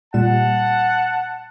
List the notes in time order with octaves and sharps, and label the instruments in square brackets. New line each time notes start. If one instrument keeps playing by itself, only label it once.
[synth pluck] A#2 G3 E7 [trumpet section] F#5 A5